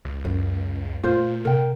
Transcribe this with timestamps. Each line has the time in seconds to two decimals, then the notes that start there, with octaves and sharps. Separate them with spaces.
0.05 C#2
0.25 F#2 A#3 C#4
1.03 A#2 A3 F4 C5
1.45 C3 A#4 G5